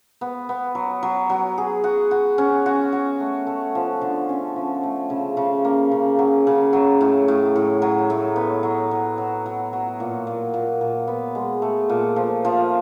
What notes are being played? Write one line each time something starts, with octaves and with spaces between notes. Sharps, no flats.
B3
B3
F#3
F#3
F#3
G#4
F#4
F#4
C#4
F#4
F#4
A3
A3
F3
D3
C#4
F3
A3
C#3
C#3
A#3
C#3
F#3
C#3
F#3
A2
A2
A2
F#3
A2
B3
F#3
F#3
F#3
F#3
F#3
A#2
A#2
A#2
A#2
B3
G#3
A3
A#2
F3
F3